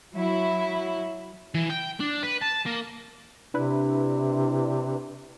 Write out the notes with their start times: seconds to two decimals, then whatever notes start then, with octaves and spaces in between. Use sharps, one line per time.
0.14 F#3 E4
1.55 E3
1.70 G5
2.00 D4
2.23 B4
2.42 A5
2.66 A#3
3.54 C3 D4 E4 B4